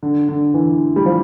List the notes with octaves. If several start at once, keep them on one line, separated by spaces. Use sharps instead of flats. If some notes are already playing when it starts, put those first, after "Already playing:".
D3
D3
E3
G3
F3